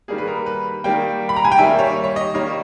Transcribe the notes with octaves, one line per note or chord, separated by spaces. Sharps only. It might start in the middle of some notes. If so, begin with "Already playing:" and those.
D#3 G3 A#3 G#4
B4
A#4
B4
D#3 G3 A#3 G5
B5
A#5
G#5
G5
D#3 G3 A#3 E5
C#5
C#5
D#5
D#3 G3 A#3 C#5